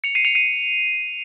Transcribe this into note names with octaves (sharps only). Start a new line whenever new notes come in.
C#7 F7
C7 D#7
C#7 F7
C7 D#7